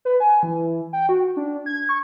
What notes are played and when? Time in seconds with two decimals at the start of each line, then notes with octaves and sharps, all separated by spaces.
0.05 B4
0.20 G#5
0.43 E3
0.93 G5
1.09 F#4
1.36 D4
1.66 G#6
1.89 C#6